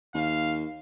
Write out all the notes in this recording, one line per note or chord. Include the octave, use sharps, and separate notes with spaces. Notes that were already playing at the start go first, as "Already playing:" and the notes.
D#2 F5